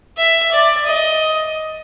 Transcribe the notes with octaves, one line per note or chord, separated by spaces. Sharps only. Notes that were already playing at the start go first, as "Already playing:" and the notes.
E5
D5
D#5